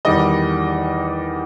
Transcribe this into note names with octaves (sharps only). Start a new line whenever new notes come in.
E2 D#3 G3 D#5